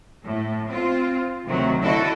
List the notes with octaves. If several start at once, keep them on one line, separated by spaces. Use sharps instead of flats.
A2
C4 F4
D2 C3 D#3 F#3
D3 D4 E4 F#4 A4 D#5